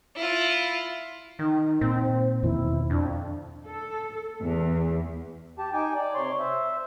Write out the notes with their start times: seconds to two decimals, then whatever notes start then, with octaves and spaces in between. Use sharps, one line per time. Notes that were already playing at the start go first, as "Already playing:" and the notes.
0.16 E4 F4
1.39 D#3 D#4
1.81 A#2 C4
2.02 C5
2.43 E2 B2 D#3 E4
2.90 F2 D4
3.66 A4
4.43 E2
5.58 G4 A5
5.73 D#4 G5 G#5 D6
5.95 D5
6.15 C3 C#5 C6
6.39 C5 E5